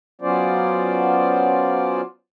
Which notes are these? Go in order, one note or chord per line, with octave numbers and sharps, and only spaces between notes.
F#3 B3 C#4 F4 C5 D5